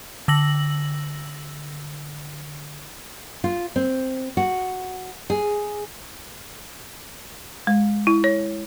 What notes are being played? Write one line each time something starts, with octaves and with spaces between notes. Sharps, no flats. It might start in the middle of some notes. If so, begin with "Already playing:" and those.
D3 E6 A#6 F#7
F4
C4
F#4
G#4
G#3
E4
C#5